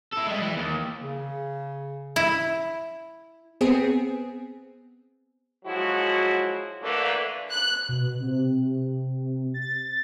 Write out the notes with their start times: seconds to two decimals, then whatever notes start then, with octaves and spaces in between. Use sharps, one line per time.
0.13 E4 A4
0.27 G3 G#3
0.42 E3
0.57 D#2
0.99 C#3
2.16 E4
3.61 B3 C4 G#4
5.65 F3 F#3 G#3 E4 F#4
6.82 D3 E3 A3 A#3
7.51 F#6
7.89 B2
8.20 C3
9.54 A6